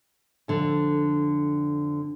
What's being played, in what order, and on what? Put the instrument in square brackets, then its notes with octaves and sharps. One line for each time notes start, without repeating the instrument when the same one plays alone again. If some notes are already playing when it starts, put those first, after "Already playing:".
[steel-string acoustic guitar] F2 D3